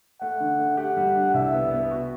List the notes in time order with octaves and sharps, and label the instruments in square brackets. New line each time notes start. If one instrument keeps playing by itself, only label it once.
[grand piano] A3 [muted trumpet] F#5
[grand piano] D3
A3
[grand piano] G4 [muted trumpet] F#5
[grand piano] G3
D4
[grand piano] C2 [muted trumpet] E5
[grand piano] B3
B3
F#4